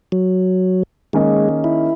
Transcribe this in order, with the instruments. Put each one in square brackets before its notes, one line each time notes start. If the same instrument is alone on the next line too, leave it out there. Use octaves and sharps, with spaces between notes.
[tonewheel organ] F#3
[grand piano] D#3 A#3 C#4 G#4 D#5 [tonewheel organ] G#3
[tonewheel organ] E4